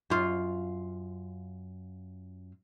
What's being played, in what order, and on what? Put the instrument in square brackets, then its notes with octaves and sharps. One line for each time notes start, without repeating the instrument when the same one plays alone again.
[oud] F#2 F4